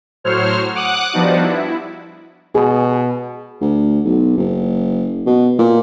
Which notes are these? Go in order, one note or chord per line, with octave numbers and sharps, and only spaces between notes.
A2 F#3 C5 C#5 F6
F#5 D6 D#6 F#6
F3 G3 B3 D4 D#4 F#4
E4
B2 G#4
D2
B1
F#1
B2
A#2